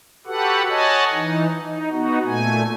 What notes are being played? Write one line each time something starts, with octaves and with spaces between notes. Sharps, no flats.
F#4 G4 A4 B4 F#5
C#5 D#5 F#5 G#5 A5
E3 D#4
D#4
B3 D#4 F#4
A#2 A3 G#5